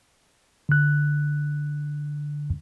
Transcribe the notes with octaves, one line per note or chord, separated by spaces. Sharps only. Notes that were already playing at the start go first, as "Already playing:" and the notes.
D3 F#6